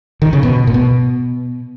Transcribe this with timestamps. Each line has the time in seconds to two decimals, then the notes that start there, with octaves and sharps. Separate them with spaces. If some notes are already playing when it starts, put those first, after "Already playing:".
0.22 D#3
0.33 C#3
0.43 B2
0.67 A#2
0.74 B2